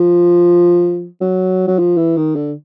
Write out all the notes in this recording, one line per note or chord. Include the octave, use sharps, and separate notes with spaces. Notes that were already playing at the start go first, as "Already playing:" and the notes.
Already playing: F3
F#3
F#3
F3
E3
D#3
D3